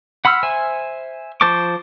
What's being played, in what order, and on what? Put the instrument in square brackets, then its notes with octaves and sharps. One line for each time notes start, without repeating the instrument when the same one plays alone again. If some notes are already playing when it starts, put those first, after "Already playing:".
[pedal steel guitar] F#5 B5 C6 E6 F6
C5 E5 G#5
F3 C5 A5 C#6 D6